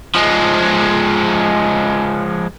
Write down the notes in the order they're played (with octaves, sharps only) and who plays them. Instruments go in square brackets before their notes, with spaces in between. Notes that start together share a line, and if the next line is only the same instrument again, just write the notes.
[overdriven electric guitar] F3 G#3